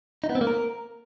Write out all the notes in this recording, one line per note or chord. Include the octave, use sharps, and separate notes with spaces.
D#4
B3
C4
A#3
A#4